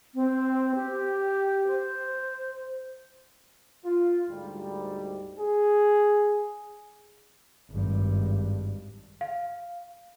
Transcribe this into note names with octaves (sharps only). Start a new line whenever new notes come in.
C4
G4
C5
F4
D2 G#2 G3
G#4
G#1 G2
F5